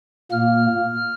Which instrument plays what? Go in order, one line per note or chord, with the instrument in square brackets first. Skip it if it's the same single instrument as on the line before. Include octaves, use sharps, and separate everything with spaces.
[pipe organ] A#2 A#3 F6